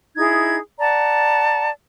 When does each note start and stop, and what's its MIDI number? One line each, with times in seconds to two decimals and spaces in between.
0.16 0.58 63
0.16 0.58 64
0.16 0.58 68
0.16 0.58 92
0.80 1.69 74
0.80 1.69 78
0.80 1.69 81
0.80 1.69 82